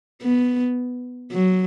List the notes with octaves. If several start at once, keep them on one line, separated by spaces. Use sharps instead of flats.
B3
F#3